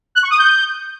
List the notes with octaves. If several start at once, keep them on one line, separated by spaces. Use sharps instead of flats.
F#6
C#6
D#6
G6